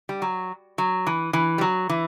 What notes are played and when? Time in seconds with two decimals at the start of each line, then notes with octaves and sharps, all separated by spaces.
0.09 G3
0.22 F#3
0.78 F#3
1.07 E3
1.33 E3
1.58 G3
1.61 F#3
1.89 E3